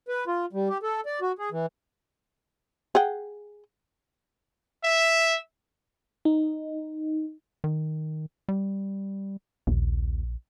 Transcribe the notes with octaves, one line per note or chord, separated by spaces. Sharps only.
B4
F4
G3
G4
A4
D5
F#4
G#4
E3
G#4 F#5 G5
E5
D#4
D#3
G3
A#1 D#2